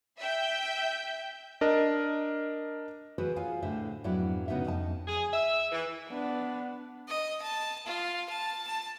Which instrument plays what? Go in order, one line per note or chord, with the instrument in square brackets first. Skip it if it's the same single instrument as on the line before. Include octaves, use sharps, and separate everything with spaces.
[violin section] E5 G5 G6
[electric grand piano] D4 A#4 D#5
[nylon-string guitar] E3 F#4 G#4 B4 C5
F4 G#4 C#5 F5 G#5
A2 D3 C5 E5
F2 G#2 F#3 B3 D4 E4
C#3 B3 D#4 F#4 E5
F2 D#4 A5
[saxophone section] G#4
E5
E3
[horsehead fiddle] B3 D4
[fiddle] D#5
A5
F4
A5
A5